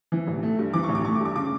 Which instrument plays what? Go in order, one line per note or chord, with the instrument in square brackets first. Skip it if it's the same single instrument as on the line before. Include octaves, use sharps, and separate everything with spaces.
[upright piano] E3
A1
A3
G2
E3 D6
C#6
A1
D6
A3 C#6
D6
G2
D6
C#3 D6